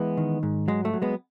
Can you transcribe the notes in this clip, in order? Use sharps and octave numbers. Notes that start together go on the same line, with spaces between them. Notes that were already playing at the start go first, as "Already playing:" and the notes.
Already playing: E3 G#3 B3
D#3
G#2
F#3 G#3
A3
F#3
G#3 B3